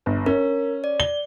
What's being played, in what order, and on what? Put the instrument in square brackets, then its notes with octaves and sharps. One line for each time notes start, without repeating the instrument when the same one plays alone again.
[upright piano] G1
[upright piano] C#4 [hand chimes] A#4
[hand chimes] D5
[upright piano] G7